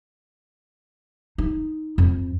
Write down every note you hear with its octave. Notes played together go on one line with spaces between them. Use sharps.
D#4
F2